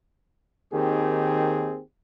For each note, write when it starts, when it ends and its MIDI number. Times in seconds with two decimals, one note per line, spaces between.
0.73 1.80 39
0.73 1.80 51
0.73 1.80 60
0.73 1.80 67
0.73 1.80 68